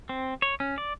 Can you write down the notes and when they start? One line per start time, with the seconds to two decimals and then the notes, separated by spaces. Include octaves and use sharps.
0.09 C4
0.42 C#5
0.60 C#4
0.78 D5